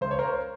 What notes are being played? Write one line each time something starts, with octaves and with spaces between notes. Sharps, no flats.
C#2 C5
C#5
A#4 C5